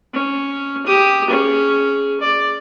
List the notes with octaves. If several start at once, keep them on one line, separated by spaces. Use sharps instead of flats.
C#4
G4 D#6
C#4 G#4
D5